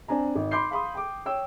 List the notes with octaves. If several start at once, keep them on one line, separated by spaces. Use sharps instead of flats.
C4 D4 G#5 A#5
G#1
B5 C6 D6 G6 C7
F5 B5 C6 D#6
G5 D6
C#5 G5 E6